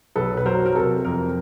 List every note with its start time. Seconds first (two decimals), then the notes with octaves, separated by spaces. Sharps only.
0.16 B1 A4 B4
0.37 B4
0.46 F#3 A#4 C5
0.66 A#4
0.75 C3 A4
1.05 F2 A#4